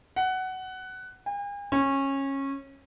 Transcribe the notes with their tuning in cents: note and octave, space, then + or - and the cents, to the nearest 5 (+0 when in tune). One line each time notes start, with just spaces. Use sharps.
F#5 +15
G#5 -45
C#4 -20